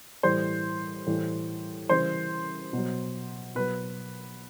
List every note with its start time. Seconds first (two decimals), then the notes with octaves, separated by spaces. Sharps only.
0.23 A2 E3 G3 C5
1.06 A2 E3 G3
1.89 C#3 E3 G3 C5
2.73 B2 F#3
3.55 B2 F#3 B4